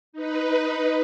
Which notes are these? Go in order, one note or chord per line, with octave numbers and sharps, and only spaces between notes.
D#4 B4